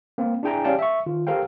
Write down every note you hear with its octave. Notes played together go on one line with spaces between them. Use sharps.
A#3 C4
D4 E4 G#4 G5 G#5 A#5
C#4 G4 D5 F5 G5 A5
E5 C#6
D#3 F4
G4 A4 A#4 C5 F5 G5